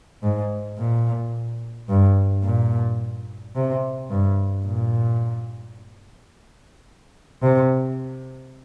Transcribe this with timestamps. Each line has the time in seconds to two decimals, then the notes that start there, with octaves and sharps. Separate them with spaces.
0.23 G#2
0.78 A#2
1.89 G2
2.44 A#2
3.55 C3
4.10 G2
4.65 A#2
7.42 C3